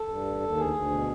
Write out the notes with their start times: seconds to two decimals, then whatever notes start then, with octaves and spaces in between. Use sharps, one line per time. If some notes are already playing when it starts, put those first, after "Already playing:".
Already playing: A4
0.08 G2
0.25 D#2
0.40 D#2
0.57 D2 G#4
0.74 D2
0.90 B2